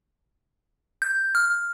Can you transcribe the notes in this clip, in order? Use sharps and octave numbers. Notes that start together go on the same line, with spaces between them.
G6
F6